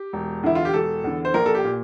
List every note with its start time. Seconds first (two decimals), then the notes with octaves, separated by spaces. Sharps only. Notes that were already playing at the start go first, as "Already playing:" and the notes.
Already playing: G4
0.13 E1
0.43 E2 D3 E4
0.55 F4
0.65 G4
0.74 E1 A4
1.04 E2 D3
1.25 C5
1.34 A#1 A#4
1.46 A4
1.55 G4
1.64 A#2